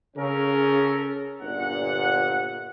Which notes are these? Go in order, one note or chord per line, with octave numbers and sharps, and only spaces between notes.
C#3 C#4 A4 A#4
G1 A#2 F#5